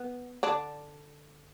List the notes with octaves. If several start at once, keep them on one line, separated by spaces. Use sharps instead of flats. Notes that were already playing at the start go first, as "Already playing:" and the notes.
Already playing: B3
D3 D4